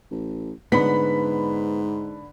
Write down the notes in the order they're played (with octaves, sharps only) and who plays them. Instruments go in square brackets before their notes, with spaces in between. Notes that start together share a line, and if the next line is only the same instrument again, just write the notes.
[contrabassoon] A1
[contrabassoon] G#2 [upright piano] D3 B5 B6 [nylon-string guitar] B3